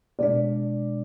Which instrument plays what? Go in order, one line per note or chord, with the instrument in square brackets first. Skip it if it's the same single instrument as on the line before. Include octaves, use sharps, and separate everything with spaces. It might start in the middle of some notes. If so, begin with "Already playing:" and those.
[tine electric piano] B2 G#3 D4 [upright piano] D5